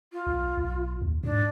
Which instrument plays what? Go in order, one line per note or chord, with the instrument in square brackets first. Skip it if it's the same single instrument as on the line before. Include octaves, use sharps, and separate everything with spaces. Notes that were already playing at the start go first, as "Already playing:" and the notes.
[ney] F4
[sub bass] B1
B1
D#2
[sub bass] G#2 [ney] D4